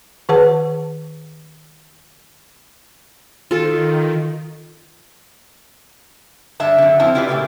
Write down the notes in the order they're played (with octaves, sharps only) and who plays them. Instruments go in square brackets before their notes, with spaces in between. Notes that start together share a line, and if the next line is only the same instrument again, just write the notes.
[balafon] D#3 G#4 B4 F#5 A5
[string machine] D#3 [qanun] F4 A4
[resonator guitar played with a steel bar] G2 D3 D4 E5 A5
F#2 D3
F2 C4 E4 F5 A5
E4 F4 G4 B4 D5
A#2 C#3 A3 A#3 G4